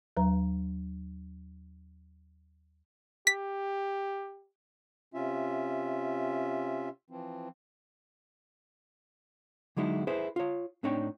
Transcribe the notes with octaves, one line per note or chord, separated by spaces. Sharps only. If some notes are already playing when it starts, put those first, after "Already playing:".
D#2 F#3 B4 A#5
G4 B6
C3 C#4 F4 E5
E3 F3 C4
D3 F#3 G#3 D#4 E4
E4 G#4 B4 C5
F4 C#5
A2 C4 D4 D#4 C#5 G5